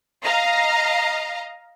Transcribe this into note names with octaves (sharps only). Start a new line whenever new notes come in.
D#5 F5 A#5